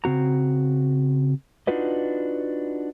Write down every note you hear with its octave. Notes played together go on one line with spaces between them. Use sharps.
C#3 C4 F#4 A#5
D4 D#4 F4 F#4 B4 D#5